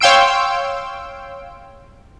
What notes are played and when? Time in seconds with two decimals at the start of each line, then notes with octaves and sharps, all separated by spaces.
0.01 C#5 F5 G5 C6 E6 D7